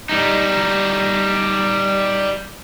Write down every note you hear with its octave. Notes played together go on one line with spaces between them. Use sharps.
G3 D#4